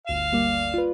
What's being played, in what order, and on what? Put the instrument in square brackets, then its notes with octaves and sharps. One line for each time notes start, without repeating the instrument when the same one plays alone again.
[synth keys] G1 D2 E7 [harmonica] F5
[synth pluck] G3 A#3 D5
F4 B4